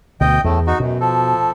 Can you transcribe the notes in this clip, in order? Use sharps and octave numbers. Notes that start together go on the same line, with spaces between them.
D2 B2 D#5 G5
E2 A2 A3
D#4 F#4
F#2 B2
F3 A4